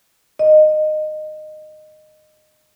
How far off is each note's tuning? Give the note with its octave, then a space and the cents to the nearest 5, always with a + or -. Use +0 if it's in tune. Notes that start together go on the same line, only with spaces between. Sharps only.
D#5 -20